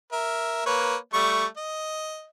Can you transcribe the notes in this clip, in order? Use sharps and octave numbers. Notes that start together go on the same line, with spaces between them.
A#4 E5
A#3 B4 C#5
G3 A3 C#6
D#5